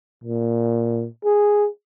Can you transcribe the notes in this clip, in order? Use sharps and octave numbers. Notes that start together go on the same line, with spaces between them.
A#2
G#4